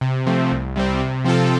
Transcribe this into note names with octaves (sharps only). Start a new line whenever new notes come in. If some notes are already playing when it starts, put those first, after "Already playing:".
C3
F3 A3 C4
C2
C3 G3 C4
C3
F3 C4 F4 A4